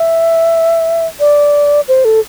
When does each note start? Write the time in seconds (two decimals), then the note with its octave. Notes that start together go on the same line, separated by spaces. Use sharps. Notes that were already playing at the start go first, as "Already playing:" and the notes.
Already playing: E5
1.20 D5
1.88 C5
2.05 A4